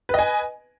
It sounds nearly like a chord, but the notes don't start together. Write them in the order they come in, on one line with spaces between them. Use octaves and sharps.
B4 D#5 G#5